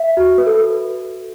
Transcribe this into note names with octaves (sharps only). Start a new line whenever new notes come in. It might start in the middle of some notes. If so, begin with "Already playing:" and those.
Already playing: E5
F#4
B4
A4